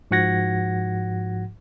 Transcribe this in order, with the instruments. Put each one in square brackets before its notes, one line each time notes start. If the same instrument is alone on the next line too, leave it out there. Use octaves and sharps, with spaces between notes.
[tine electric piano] G#2 F3 F#4 F#5 G#6 A#6